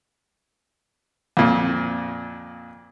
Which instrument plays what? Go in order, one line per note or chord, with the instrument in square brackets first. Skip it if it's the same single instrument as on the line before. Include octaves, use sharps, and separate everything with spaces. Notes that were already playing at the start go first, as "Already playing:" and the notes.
[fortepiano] F2 A#2